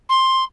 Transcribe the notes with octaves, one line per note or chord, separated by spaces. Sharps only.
C6